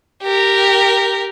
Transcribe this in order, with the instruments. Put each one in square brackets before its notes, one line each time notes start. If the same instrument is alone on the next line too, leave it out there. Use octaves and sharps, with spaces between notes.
[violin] G4 A#4